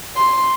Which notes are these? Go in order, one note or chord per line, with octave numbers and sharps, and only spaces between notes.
C6